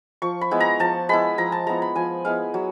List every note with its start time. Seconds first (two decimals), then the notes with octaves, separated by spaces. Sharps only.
0.22 F3 C#6
0.41 B5
0.51 G#3 B3 E4
0.60 A#5
0.80 F3 A5
1.09 G#3 B3 E4 B5
1.38 F3 A#5
1.52 A5
1.67 G#3 B3 E4 A#5
1.82 B5
1.96 F3 G#5
2.25 G#3 B3 E4 F5
2.54 F#3